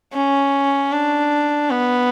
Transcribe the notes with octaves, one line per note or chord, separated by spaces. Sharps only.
C#4
D4
B3